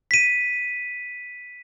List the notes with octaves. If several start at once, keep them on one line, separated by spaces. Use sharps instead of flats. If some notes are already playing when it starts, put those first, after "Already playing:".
B6 D#7